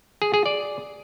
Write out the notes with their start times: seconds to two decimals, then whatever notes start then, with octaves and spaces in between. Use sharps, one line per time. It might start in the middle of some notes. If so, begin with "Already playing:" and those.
0.22 G#4
0.34 G#4
0.46 D5